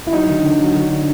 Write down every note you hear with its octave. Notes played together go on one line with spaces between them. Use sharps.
E4
F#3 D#4
D3
D3
F#3
D3
D3